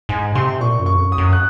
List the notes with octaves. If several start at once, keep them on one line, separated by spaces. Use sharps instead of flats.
G#2 G#5
C3 C6
A#2 C#6
F#2
C#6
F2
F#2
D#6
F#2
F#6